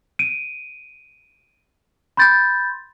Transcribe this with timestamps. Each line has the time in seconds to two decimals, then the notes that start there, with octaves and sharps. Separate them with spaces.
0.19 D7 D#7
2.17 B5 C6 G6 A6